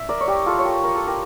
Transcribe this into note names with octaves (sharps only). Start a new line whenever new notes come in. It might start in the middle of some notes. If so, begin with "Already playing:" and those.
Already playing: E5
A#4 D5
C#5
G4 A#4
F4 A4
C#5
G4 A#4
A#4
A4
G4 A#4